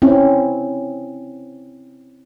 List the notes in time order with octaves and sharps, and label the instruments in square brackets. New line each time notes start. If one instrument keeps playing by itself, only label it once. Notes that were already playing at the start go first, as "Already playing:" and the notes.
[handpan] C4 C#4 E4